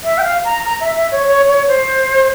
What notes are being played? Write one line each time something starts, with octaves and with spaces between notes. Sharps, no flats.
E5
G5
F5
A#5
A#5
E5
E5
C#5
C#5
C#5
C5